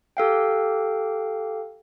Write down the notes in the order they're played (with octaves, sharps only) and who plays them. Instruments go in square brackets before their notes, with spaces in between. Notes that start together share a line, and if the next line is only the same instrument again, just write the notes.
[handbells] G4 A4 F5 G5